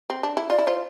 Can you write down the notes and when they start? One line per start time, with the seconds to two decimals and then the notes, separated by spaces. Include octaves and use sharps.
0.10 C4
0.23 D4
0.37 E4
0.50 F4 D5
0.58 E4
0.67 F4 C5